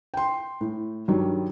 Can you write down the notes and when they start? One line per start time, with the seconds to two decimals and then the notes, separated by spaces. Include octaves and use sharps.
0.14 G5 C6
0.61 A2
1.08 G2 D#3 F#3 G3